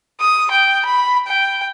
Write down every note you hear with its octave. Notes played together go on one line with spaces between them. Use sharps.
D#6
G5
B5
G5